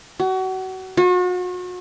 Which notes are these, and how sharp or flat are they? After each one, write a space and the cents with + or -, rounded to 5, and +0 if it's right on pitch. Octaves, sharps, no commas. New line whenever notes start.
F#4 +30
F#4 -40